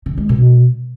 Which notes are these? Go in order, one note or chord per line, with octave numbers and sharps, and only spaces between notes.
D3
G#3
B2